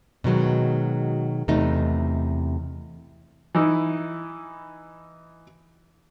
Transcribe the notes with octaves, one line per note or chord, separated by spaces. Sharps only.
B2 D#3 F#3 G#3
E2 C3 A3 D#4
E3 D#4 E4